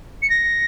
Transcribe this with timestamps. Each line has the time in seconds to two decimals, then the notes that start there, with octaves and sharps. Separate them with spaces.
0.22 C#7
0.30 A#6